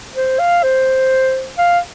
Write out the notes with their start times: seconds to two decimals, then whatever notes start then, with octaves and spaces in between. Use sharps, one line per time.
0.15 C5
0.39 F5
0.63 C5
1.58 F5